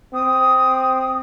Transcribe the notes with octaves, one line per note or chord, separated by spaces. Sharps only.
C4 D#6